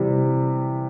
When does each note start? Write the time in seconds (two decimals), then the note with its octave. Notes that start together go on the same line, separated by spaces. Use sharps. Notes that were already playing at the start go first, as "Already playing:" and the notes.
Already playing: C3 E3 G3